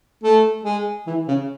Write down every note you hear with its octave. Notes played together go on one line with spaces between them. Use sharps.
A3
G#3
E3
C#3